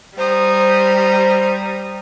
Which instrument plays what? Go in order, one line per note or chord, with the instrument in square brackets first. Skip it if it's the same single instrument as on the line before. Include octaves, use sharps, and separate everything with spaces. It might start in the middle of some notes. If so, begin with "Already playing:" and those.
[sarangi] G3 [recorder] C5 [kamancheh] A#5 D#6